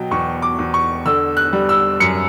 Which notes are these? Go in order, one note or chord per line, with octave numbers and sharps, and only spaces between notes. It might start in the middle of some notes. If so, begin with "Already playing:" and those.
Already playing: B2 F#3 G5
E2 C#6
D6
E2
C#6
D3 E6
F#6
G3
E6
F#2 C#7